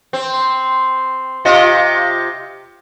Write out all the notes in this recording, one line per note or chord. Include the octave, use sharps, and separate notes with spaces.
C4
C3 F4 D#5